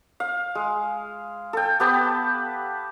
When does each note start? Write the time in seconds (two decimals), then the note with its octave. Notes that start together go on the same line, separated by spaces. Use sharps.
0.20 F5
0.55 G#3
1.53 A4 G5
1.80 B3 G4 B4 A5